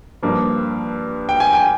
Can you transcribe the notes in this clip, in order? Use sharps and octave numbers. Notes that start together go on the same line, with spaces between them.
G2 F3 A#3
G5
G#5
G5